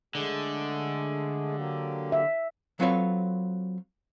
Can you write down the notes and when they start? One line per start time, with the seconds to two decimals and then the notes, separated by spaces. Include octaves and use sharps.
0.15 D3 G#3 A3 G#4
1.56 F#3 A#3 G4
2.12 E5
2.80 F#3 C4 F4 A4 B4 C#5